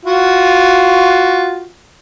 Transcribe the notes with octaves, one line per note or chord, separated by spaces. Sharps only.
F4 F#4